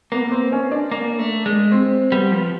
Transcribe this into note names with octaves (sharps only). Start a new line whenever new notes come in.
A#3 B3
B3
C4
C#4
D4
A#3
A3
G#3
C4
G3 B3
F3